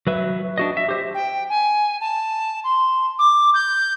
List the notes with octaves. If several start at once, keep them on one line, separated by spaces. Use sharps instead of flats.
F#3 B4 E5
D4 F#4 D#5
E5
G4 C5 E5
G5
G#5
A5
C6
D6
G6